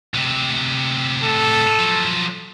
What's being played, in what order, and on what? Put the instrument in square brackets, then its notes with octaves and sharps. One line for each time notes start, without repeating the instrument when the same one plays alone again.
[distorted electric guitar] D2 C3
[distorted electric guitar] A2 C3 [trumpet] A4
[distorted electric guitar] F3 F#3